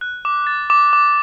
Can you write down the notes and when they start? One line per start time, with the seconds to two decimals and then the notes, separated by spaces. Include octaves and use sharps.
0.01 F#6
0.25 D6
0.47 A6
0.70 D6
0.93 D6